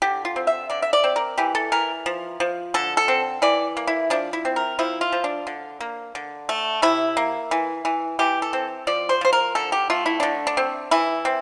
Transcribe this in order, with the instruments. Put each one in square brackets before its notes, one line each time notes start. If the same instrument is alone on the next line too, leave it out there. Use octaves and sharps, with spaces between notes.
[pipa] D3 G4
F4
C4
E5
D3 D5
E5
D5
C4
A#4
E3 G4
A4
E3 A#4
F3
F3
D3 A4
A4
C4
E3 D5
A#3
E4
F3 D4
E4
C4
A#4
F3 E4
F4
F3
D4
D3
A#3
D3
A3
C3 E4
A#3
E3
E3
E3 G4
A4
C4
F3 D5
C5
F3 C5
A#4
D3 A4
G4
A3 F4
E4
D3 D4
D4
C4
E3 E4
C4